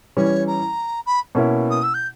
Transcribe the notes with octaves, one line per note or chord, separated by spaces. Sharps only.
E3 G3 C#4 C#5
A#5
B5
B2 A#3 C#4 E4
D#6
E6
G6